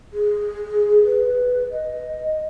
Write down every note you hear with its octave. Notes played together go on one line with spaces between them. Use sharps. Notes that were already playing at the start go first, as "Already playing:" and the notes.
G#4
B4
D#5